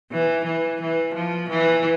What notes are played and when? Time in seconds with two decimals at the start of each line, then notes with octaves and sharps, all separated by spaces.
0.12 E3
0.45 E3
0.81 E3
1.14 F3
1.50 E3